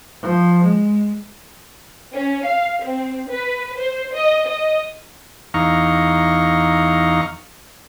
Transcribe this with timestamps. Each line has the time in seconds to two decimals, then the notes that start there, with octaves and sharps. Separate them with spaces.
0.23 F3
0.64 G#3
2.15 C#4
2.46 F5
2.83 C4
3.30 B4
3.79 C5
4.15 D#5
4.47 D#5
5.54 E2 D#4 F5 A#5 C#6